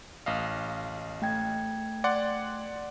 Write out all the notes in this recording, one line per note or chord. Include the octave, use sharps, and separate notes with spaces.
A1 D#5 F5
A3 G5 G#6
D5 F#5 C6